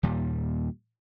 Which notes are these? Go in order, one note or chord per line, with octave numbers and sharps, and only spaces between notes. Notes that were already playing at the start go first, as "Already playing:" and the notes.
D#2 A#2 G3